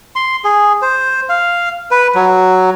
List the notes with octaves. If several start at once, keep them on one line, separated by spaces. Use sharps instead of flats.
C6
G#4
C5
F5
B4
F#3